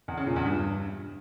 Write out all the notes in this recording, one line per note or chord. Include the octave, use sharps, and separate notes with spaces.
E2
C#3
A#2
E2
G2